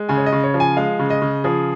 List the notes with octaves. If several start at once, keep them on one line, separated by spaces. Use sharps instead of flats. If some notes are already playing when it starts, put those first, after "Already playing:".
Already playing: G#3
C#3 G#5
C#5
D#5
C#3
C#5
F3
G#5
G#3 F5
C#3
D#5
C#3
F3 G#4